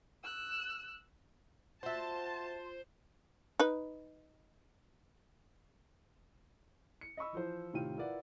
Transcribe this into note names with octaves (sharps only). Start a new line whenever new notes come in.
E6 F#6
F4 F#4 C5 E5 A5
D#4 B4
C#7
D#5 B5 C#6 E6
E3 F3 C5
A2 C3 D#3 F4 G5 D#7
E4 F4 A#4 B4 D5 F#5